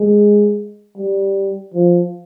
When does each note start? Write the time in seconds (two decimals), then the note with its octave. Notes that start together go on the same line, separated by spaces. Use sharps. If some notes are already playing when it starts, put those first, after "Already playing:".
Already playing: G#3
0.97 G3
1.74 F3